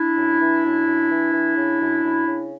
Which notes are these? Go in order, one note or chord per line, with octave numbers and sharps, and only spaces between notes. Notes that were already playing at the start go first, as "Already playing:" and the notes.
Already playing: D4 E4
F#2
E3
F#2
F#2
E3
E3
C#3
F#2
F#2
C#3